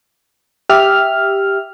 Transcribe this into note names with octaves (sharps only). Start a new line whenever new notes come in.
G4 E5 F6